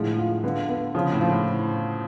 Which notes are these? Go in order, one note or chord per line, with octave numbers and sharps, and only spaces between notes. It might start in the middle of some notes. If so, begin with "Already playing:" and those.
Already playing: A2 D3 F3 G#3
F4
D3 B3
B3
C#3 F3
A2
F3
A2